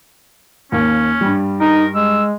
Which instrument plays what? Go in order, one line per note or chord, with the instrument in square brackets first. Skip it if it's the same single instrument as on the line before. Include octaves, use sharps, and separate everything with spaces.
[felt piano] D#2 A#3 [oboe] C#4
[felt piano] G2 G3
[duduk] D#4 [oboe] A#4
[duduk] G#3 [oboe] E6